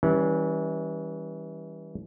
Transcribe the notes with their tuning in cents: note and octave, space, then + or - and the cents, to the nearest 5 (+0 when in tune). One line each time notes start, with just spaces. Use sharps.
E3 -30 G3 +0 C#4 +0